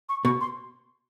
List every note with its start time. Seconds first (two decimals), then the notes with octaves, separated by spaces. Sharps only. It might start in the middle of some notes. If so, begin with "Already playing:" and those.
0.09 C#6
0.25 B2 C#6
0.41 C6